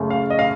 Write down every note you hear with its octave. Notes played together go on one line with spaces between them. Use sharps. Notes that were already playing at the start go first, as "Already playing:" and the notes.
Already playing: F#2 C#3 A3
F5
D#5
F5